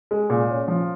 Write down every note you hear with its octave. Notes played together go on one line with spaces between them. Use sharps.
G#3
A#2
C#4
F3